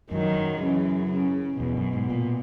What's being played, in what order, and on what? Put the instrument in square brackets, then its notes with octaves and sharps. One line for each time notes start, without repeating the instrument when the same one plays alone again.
[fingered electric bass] F#2 [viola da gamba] D#3 F#3
[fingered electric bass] F#2
[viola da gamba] C#3 E3
C#3
[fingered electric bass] E2 [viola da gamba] B2
[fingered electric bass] F#2
G#2
A#2